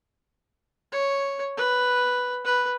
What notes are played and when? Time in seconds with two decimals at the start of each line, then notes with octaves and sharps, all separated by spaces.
0.92 C#5
1.57 B4
2.44 B4